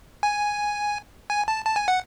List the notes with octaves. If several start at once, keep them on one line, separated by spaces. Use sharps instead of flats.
G#5
G#5
A5
A5
G#5
F#5